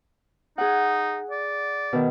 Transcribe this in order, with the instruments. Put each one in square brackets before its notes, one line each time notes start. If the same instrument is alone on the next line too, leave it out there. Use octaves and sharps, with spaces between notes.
[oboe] D#4 [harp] G#4 F#5
[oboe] D5
[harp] B2 D#3